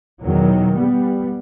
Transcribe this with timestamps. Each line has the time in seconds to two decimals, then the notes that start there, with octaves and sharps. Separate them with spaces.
0.23 E2 B2 D#3 F#3
0.77 G3 B3